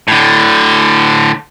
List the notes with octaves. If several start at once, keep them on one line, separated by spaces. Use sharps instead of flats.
A2 D3